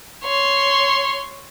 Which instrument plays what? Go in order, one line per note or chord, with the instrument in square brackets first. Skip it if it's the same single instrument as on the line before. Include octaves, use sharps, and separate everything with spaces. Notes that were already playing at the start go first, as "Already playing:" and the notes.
[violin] C#5 C6